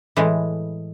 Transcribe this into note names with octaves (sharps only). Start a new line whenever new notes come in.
A2 E3 G#3